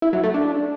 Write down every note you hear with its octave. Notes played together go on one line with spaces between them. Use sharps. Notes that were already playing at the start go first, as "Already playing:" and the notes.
E4
F#3
A3
D4